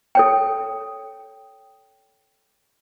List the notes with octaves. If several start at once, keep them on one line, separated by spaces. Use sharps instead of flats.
A4 C#5 G5